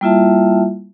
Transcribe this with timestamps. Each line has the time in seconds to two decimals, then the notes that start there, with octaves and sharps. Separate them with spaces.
0.01 G3 A#3 E4 F4 E5 A5